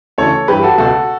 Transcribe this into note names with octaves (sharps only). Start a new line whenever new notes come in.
D2 C#3 E3 A4 C#5
G2 E3 G4 B4
F#4 A4
C#2 B2 F#4 A4